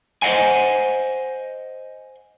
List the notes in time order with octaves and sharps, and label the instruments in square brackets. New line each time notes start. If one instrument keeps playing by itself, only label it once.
[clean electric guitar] C5 D#5 F5 F#5 G#5